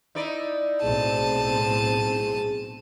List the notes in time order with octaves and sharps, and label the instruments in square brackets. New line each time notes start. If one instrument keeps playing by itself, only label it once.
[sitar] D#4 E4 D5
[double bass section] B1 A2 C4 [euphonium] G#4 [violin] A5 D#7